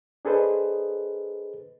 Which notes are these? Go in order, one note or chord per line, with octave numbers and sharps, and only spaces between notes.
D4 G#4 A4 B4 C5 D#5